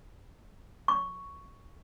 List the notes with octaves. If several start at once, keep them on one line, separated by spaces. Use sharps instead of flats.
C#6